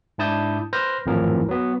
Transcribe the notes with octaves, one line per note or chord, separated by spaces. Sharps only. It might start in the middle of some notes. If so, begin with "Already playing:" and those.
G#2 D4 E4 A5 D#6 G6
B4 C5 F6 G6 A#6
G#1 F2 A2 E3 F3 A#4
F#3 B3